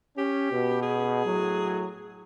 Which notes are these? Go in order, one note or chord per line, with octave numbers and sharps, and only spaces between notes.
C#4 G4
B2
G#4
A2 F#3